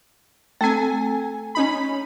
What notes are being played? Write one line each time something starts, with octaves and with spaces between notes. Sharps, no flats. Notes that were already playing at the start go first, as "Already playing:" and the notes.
A3 C4 A4 G#5
C#4 D#4 B5